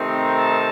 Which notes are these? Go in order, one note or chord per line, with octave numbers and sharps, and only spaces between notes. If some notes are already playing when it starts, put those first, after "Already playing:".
Already playing: C3 D#3 A3 C4 D#4
A5